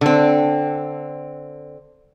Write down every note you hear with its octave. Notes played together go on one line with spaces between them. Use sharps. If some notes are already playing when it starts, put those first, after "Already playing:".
D3 C4